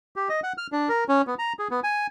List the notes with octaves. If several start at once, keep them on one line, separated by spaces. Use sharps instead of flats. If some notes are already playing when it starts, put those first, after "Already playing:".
G4
D#5
F#5
F6
D4
A#4
C#4
B3
A#5
G#4
B3
G#5